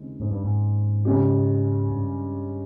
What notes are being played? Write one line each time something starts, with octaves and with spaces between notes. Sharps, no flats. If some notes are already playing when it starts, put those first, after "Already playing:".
Already playing: D#2 C#3 G#3 C4
G#2
G2
G#2
C#3 G#3 C#4 G4
G2